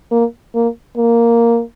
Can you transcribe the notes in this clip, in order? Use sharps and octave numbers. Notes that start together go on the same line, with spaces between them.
A#3
A#3
A#3